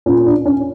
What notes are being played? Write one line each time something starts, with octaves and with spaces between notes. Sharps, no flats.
A#2 C#4
D4
C#4